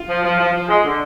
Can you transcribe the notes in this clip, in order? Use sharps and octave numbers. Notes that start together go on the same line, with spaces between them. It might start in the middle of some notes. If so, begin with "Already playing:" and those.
Already playing: F4
F3
F3
F3
F3
G#3
D3